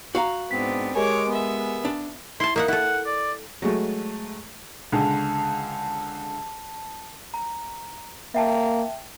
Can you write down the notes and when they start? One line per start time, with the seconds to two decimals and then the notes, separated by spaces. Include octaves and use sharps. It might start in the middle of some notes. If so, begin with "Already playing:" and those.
0.15 F#4 F5 A#5
0.51 G#2 B3 C4 D4 B6
0.95 G#3 G4 A#4 C#5 G#5 D6
1.28 B3 E5
1.85 D4
2.40 E4 A5 C6
2.56 A#3 D#4 E5 F#5
2.68 E4 A4 F#5
3.06 D5
3.62 F#3 G#3 A3
4.92 C#2 D3 G#4 A5
7.34 A#5
8.34 A#3 E5 G5 A5